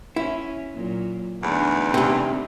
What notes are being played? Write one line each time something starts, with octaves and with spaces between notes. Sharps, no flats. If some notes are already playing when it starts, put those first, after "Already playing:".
C#4 E4
A#2 F#3
E2 D3 A3 D#4
C2 C3